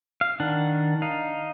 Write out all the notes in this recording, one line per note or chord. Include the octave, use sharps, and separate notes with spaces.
F5
D#3 D4 F#5
D#4 F5